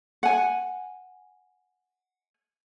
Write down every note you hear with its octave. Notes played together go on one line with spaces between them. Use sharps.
F#5 G#5